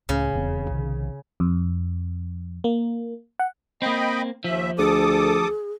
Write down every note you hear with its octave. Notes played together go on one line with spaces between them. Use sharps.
C#2 A2 C#3
D#1 E2 C4
B1 C3 D#3
F2
A#3
F#5
A#3 C4 D#5 G5 B5
D#2 F3 E5
D2 G#4 A4 D6 D#6